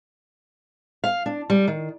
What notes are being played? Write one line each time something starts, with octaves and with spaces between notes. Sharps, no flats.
F5
D4
G3
D#3